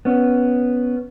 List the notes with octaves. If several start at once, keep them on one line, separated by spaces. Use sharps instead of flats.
B3 C#4